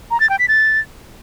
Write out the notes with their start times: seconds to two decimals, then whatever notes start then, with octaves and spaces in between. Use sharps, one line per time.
0.11 A#5
0.20 A6
0.30 G5
0.39 B6
0.48 A6